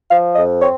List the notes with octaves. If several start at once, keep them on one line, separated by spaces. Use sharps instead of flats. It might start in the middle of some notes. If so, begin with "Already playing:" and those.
F3 F5
F2 D#5
C4 C#5